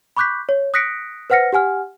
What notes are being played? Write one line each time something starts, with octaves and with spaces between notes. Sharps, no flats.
B5 C#6 D6 F#6 G6 B6
C#5
D#6 F#6 A#6 B6 C#7 D7
B4 C5 F#5 F6 A#6 C#7
G4 F#5 G#5 F6